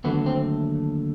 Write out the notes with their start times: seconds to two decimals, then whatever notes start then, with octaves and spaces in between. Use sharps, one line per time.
0.04 D#2 D3 F#3 A3 B3
0.26 C4